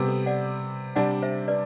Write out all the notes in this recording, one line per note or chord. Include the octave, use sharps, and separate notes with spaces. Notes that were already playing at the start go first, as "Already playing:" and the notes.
Already playing: C3 G3 B3
A4
D5 F#5
C3 G3 D4 D5 F#5
C5 E5
B4 D5